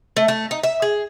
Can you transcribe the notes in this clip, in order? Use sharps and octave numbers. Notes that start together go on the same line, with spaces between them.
A3
A3
D#4
E5
G#4